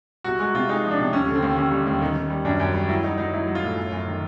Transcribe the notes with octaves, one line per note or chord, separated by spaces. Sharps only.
C2 F#4
G#3 F#4
C3 F4
G#3 D#4
F3
D4
C3
D#2 C#4
D3
C4
D#2
D#2 C#4
G3
D#2
D#3
D#3
G3
F#2 D4
F#2
G3
F#3 E4
F#3 D#4
F#3 D#4
F#3 E4
F#3
F4
A2
F#2
F#2
D#3